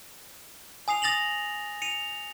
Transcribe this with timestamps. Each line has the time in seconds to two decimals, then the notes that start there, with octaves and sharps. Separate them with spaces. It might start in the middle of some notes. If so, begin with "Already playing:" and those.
0.88 G#5 D#6 C7 F7
1.02 D#6 A6 A#6 F7 F#7
1.82 C#7 D#7 F7